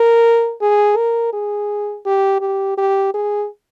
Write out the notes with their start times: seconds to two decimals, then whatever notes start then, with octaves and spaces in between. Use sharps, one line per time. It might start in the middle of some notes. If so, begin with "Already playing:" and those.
Already playing: A#4
0.61 G#4
0.97 A#4
1.33 G#4
2.05 G4
2.41 G4
2.77 G4
3.14 G#4